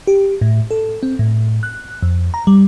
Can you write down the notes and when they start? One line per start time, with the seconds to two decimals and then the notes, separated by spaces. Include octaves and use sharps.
0.07 G4
0.41 A2
0.71 A4
1.03 C4
1.19 A2
1.63 F#6
2.03 F2
2.34 A#5
2.47 G3